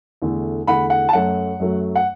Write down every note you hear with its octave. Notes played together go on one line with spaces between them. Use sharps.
E2 D3 A3
E2 D3 A3 F#5 B5
F#5
A5
F#2 F#3 A3 F#5
F#2 F#3 A3
F#5